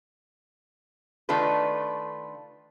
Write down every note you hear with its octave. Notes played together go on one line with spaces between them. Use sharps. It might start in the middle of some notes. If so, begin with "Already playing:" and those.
D#3 A3 D4 F4 A4 B4